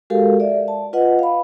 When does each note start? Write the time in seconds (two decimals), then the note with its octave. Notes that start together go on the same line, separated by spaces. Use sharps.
0.10 G#3 F#4 G4 A4 A#4 F5
0.40 D5 E5
0.68 A5
0.93 F4 B4 D#5 F#5
1.19 F5 B5